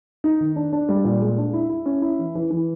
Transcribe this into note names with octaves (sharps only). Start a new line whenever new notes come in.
D#4
D#3
D4
D4
G3
A#2
G#3
D4
E4
E4
C#4
E4
E3
E3
E3